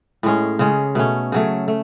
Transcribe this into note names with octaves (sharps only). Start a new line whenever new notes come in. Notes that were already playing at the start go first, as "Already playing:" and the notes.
A2 G#3 C#4
C#3 G#3 C#4
B2 A3 C#4
C#3 F#3 A3
A3